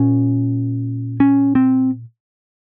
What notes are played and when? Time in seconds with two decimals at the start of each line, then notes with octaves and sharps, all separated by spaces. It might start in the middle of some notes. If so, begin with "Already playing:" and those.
Already playing: A#2 C#4
1.20 C#4
1.55 C4